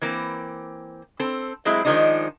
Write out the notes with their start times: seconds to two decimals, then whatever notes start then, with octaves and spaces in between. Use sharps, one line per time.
0.02 E3 A#3 C4
1.20 C4 A4
1.65 F#3 G#3 A3 C4 E4
1.85 D#3 F3 F#3 G#3 D4 D#4